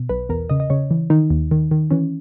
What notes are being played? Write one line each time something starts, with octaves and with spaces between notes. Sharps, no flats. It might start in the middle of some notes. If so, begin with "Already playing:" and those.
Already playing: B2
B1 B4
E2 A#4
C#3 D#5
D#5
C#3 C#5
E3
D#3 D#4
D#2
D#3
D#3
E3 C#4